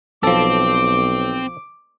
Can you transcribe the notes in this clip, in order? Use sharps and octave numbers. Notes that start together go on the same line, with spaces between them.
B1 F3 C4 A4 D6